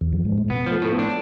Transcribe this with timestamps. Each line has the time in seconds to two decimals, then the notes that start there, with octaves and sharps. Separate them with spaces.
0.01 E2
0.13 F2
0.25 G#2
0.38 A2
0.50 B2 B3
0.66 F3 A3
0.82 A2 A3
0.92 B3
0.99 D4